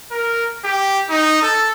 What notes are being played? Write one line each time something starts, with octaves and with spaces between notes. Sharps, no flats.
A#4
G4
D#4
A4